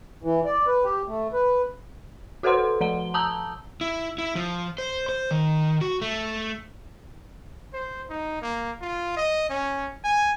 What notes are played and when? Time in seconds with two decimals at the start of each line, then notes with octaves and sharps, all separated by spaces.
0.23 E3
0.45 D5
0.67 B4
0.84 G4
1.08 A3
1.33 B4
2.43 F#4 A4 B4 C5 F#5 C6
2.81 F3 F#5 G7
3.14 A5 A#5 D#6 E6 G6 G7
3.81 E4
4.18 E4
4.35 F3
4.78 C5
5.09 C5
5.31 D#3
5.81 F#4
6.02 A3
7.73 C5
8.10 D#4
8.42 A#3
8.81 F4
9.17 D#5
9.49 C#4
10.04 G#5